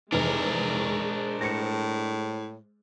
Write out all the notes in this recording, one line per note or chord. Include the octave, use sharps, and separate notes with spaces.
F1 E3 G#3 D4 A#4 C5
A2 A#6 C#7